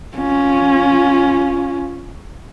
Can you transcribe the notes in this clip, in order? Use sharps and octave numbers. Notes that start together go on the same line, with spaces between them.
C#4 F4